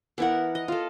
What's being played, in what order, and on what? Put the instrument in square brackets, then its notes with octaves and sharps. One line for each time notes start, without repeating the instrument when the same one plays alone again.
[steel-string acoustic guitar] E3 F#5 [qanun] B3 E4 A#4
[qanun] D#5
F4 A4